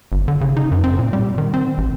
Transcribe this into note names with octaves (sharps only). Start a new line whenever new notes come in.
G1
D3
C#3
D#4
F#2
C4
A#2
G3
D#3
C4
A1